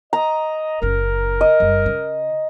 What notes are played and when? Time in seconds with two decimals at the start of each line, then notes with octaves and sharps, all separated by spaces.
0.13 D#5 A#5
0.82 F#1 C#3 A#4
1.41 D#5
1.60 F#1 G3
1.86 C#3